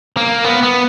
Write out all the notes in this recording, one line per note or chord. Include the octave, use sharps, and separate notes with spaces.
A#3
B3
B3